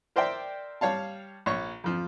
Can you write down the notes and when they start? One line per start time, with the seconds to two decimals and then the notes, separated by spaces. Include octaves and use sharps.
0.16 A#4 C5 D5 E5 G5
0.81 G3 C#5 F5 A5
1.46 A#1 C#5 C#6
1.84 F2 F3